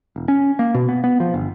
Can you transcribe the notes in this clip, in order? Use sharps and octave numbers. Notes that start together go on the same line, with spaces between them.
E1
C#4
A#3
B2
B3
B3
F3
G1